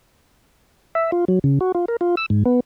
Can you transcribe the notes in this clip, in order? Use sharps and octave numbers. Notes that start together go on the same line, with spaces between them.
E5
F4
F#3
C#3
F#4
F4
A#4
F4
E6
G#2
B3